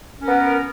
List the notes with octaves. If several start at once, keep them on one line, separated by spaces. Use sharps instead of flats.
B3 C#4 A#4